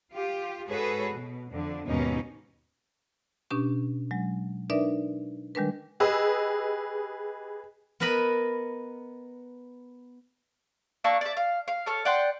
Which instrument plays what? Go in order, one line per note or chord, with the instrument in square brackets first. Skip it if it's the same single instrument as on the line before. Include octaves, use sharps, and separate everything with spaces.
[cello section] F4 G4
G#2 F#4 G#4 A4 B4 C#5
B2
F2 D3
D#2 G#2 B2 C#4 D#4
[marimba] B2 C#4 D4 G4 C#6
F#3 G#3
D4 D#4 A#4 B4 D5 E5
D#3 G3 G#3 D4 A#4 B4
[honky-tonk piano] G4 G#4 B4 D#5 E6
[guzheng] B3 A#4 B4 D#5 B5
[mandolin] A#3 D4 C#6 E6
D5 E5
F5
F5
A4 C#5 F6
D5 F#5 G5 C6